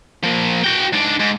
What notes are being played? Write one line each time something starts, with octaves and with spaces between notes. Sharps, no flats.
F3 A#3
F#4 G5
G#2 D4
G#2